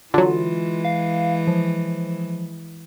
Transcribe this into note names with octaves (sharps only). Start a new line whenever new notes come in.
D3 E3 F#3 G#3 F4
F5
F3